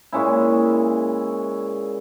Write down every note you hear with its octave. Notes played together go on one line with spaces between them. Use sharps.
A#2 G#3 C#4 E4